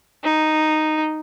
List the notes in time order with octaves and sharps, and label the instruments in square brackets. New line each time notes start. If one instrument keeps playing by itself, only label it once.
[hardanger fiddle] D#4